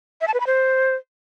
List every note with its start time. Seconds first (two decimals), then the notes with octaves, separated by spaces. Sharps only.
0.21 E5
0.28 A5
0.34 B4
0.40 B5
0.47 C5